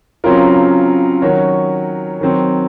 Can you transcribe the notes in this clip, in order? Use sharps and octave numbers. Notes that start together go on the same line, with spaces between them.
C#3 F#3 C4 F4 A#4
D#3 F#3 C#4 F#4 C#5
D#3 F#3 C4